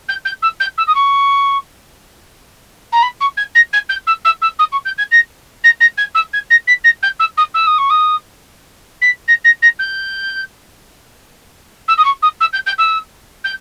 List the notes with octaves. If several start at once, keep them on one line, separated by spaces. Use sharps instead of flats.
G6
G6
E6
G6
E6
D#6
C#6
A#5
B5
C#6
G#6
A#6
G#6
G6
E6
E6
E6
D#6
C#6
G6
G#6
A#6
A#6
A#6
G#6
E6
G#6
A#6
B6
A#6
G6
E6
D#6
E6
D#6
C#6
D#6
B6
A#6
A#6
A#6
G6
E6
D#6
C#6
D#6
E6
G6
G6
E6
G6